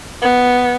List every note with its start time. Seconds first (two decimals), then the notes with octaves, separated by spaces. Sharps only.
0.22 B3